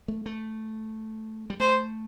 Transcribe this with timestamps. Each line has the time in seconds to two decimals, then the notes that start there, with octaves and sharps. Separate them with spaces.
0.08 A3
0.26 A3
1.50 G3
1.60 A3 C5